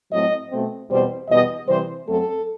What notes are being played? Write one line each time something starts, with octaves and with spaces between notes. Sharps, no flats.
A2 F#3 A3 C4 D#5
B2 A3 C4
E2 B2 G3 C4 C5
E2 B2 G3 B3 D#5
C3 E3 G3 C5
F#2 F#3 A3 C4 A4